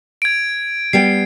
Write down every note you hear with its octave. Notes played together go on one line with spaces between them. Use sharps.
G#6 D7
G3 B3 G5 C7